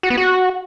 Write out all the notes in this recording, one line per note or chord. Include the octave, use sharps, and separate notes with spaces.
F#4
B3
F#4